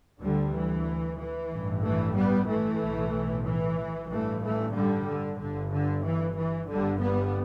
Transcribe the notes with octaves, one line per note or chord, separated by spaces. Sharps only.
D2 D3 G3
E3
E3
A1 G2
E3 A3
G3 B3
E3 A3
B1 A2
E3
A1 G2 E3 A3
E3 A3
D3 G3
D3
G1 G2 D3
D3
E3
E3
G1 G2 D3 G3
G3 B3